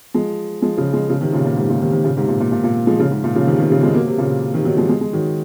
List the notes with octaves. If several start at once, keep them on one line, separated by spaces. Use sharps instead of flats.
F3 G#3
F3 G#3
C#3 F3
F3 G#3
C#3 F3
C3 D#3
A#2 C#3
A#2
G#2 C3
A#2 C#3
C3 D#3
C3 D#3
A#2 C#3
G#2 C3
A#2
A#2
A#2
A#2
F3 G#3
C#3 F3
G#2
A#2
C#3 F3
C3 D#3
C3 D#3
C#3 F3
F3 G#3
F#3 A#3
C3
A#2 C#3
C3 D#3
D#3 F#3
F3 G#3
F3 G#3
G#3
D#3 F#3